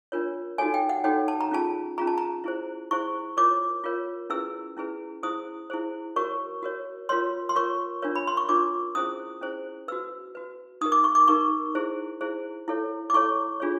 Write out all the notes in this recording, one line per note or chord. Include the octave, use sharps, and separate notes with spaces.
D4 F4 A#4 C#5
D#4 F#4 A4 C#5 G#5
G5
F#5
D#4 F#4 A4 C#5 G5
A5
A#5
C#4 F4 G#4 A5
C#4 F4 G#4 A#5
A5
A#5
E4 G#4 C5
E4 G#4 C5 C#6
F4 A#4 C#5 D6
F4 A#4 C#5
C#4 E4 G#4 B4 E6
C#4 E4 G#4 B4
E4 G#4 C5 D#6
E4 G#4 C5
F#4 A#4 C#5 C#6
F#4 A#4 C#5
F4 A#4 C#5 C6
C6
F4 A#4 C#5 C#6
D4 F4 A#4 C#5
B5
C6
C#6
D4 F4 A#4 C#5 D6
C#4 E4 G#4 C5 D#6
C#4 E4 G#4 C5
F#4 B4 E6
F#4 B4
D#4 G4 A#4 D#6
D6
C#6
D6
D#4 G4 A#4 C#6
E4 G#4 C5
E4 G#4 C5
E4 A4 C#5
D6
E4 A4 C#5 C#6
D4 F4 G#4 C#5